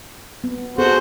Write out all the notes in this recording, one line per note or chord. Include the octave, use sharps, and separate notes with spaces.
B3
B3 F#4 G#4 A4 C5